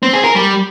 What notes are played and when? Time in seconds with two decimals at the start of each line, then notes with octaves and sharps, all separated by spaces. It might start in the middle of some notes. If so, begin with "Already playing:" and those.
0.03 C4
0.13 G#4
0.24 A#4
0.35 G3